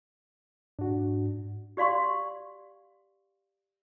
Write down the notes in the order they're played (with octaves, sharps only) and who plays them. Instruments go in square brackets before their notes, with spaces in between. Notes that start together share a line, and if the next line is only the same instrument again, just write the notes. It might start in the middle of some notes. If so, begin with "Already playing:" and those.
[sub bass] G#2 [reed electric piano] D4 F#4
[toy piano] G4 D5 F5 C6 C#6